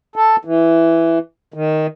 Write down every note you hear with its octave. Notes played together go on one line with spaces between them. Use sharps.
A4
E3
D#3